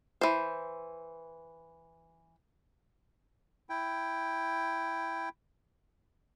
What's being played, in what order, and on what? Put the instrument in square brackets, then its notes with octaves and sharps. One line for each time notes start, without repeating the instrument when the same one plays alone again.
[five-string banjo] E3 C5
[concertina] E4 G5